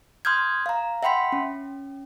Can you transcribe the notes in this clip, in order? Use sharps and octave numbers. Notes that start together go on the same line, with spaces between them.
C6 D#6 F6 G6 G#6
F5 A#5
E5 F#5 G5 B5 C6 B6
C#4